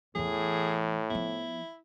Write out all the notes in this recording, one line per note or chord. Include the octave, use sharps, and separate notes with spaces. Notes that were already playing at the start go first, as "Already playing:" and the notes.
E2 A2 E3 G#4
F3 B3 E4